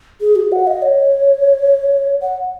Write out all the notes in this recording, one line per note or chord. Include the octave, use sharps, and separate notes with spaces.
G#4
F#4
F#5
D#5
C#5
F#5